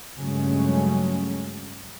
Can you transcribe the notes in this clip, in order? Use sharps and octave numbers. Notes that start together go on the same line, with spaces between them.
G2 C#3 F#3 G#3 A3 C#4